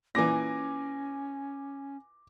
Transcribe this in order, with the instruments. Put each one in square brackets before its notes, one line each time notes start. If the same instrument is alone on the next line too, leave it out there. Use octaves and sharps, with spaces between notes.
[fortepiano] A#2 E3 [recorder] C#4 [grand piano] G#5 D6 A#6